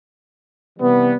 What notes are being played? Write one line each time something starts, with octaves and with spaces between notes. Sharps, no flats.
C3 E3 G3 B3